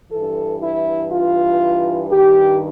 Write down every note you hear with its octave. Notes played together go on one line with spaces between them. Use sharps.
G2 E3 A4
E4
F4
G2 D#3 G4